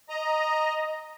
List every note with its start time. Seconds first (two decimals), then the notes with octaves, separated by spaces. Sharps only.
0.09 D#5 A#5